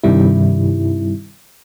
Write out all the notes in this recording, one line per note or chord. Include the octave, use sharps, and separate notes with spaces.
G2 C3 D#3 G3 E4